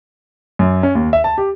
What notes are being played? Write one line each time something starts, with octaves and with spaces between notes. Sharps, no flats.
F#2
C#4
D#2
E5
A5
G4